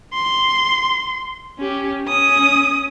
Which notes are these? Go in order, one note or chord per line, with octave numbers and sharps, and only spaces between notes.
C6
C#4 G4
C#4 D#6